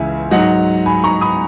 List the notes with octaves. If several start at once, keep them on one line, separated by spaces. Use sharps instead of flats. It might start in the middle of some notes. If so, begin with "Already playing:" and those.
Already playing: C#2 C#3 E3 E5 G#5
G#2 F#3 D#5 F#5
G#5 B5
A#5 C#6
B5 D#6